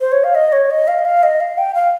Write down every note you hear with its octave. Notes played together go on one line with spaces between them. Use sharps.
C5
C#5
F5
D#5
C#5
D#5
F5
D#5
F5
D#5
F5
G5
F5